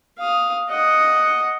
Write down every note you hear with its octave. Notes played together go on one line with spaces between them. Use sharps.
F5 D#6
D#5 F#5